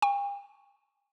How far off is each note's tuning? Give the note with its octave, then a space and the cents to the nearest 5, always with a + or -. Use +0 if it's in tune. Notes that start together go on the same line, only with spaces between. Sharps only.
G5 +45 C#6 +0